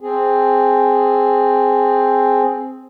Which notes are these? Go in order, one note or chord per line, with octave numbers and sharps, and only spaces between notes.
C4 G#4